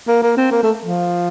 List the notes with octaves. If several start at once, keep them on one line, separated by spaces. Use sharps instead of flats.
A#3
A#3
C4
A#3
A3
F3